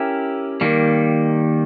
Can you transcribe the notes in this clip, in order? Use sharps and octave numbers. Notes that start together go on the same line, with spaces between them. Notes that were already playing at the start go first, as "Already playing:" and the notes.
Already playing: C#4 E4 G4 A#4 E5
D#3 G3 A#3